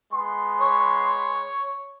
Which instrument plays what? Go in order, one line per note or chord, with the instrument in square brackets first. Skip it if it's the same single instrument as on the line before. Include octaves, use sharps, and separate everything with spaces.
[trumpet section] G#3 B3 C6
[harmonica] C#5